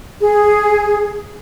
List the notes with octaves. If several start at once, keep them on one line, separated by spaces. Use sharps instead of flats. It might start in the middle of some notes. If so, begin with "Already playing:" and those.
G#4